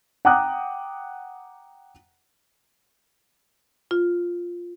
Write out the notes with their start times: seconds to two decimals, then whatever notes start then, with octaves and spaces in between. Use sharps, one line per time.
0.25 F#5 G5 A#5 D6 D#6 F#6
3.91 F4